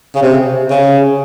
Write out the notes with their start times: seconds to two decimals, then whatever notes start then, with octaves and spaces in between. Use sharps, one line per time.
0.15 C#3
0.22 C3
0.70 C#3